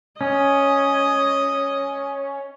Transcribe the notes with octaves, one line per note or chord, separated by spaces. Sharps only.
C#4 D#5